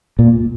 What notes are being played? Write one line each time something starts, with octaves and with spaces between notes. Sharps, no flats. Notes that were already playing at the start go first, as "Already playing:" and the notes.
A#2